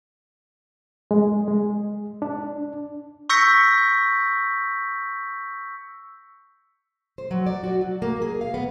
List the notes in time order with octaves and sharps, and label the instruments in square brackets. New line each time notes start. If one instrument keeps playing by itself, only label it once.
[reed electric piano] G#3
G#3
D4
[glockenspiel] C#6 E6 G6 A#6 B6 C#7
[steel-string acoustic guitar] C5
F#3
D5
F#4
F#3
A#3
G#4
F5
B3